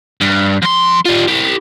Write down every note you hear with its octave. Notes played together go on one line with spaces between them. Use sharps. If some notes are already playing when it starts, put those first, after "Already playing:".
G2
F2 C6
G3 F4
E4 G4